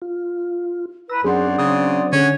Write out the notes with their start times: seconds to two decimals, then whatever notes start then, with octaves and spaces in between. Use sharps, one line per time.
0.02 F4
1.10 E4 B4 A#5 E6
1.24 F#2 F#3 C4 D4 G#4 C5 D5 F#5
1.58 C#3 D#6
2.12 D3 C#4 F#4 G#4 C#5